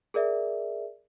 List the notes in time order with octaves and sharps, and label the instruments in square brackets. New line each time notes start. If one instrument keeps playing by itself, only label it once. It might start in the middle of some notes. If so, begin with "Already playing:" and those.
[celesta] G#4 A#4 D5 E5